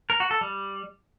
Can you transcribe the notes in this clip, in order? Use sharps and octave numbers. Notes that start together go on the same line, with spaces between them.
A#4
F#4
A4
G3